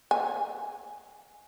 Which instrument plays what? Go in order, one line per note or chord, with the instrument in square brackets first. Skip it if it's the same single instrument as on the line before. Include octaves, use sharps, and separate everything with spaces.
[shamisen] G#5